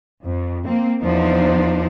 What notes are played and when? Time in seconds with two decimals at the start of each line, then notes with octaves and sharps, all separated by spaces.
0.23 F2
0.65 A#3 C4
1.01 E2 F3 D4 D#4 C5